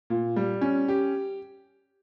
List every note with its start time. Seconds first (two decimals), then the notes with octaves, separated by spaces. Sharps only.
0.10 A#2
0.36 G3
0.61 C#4
0.88 G4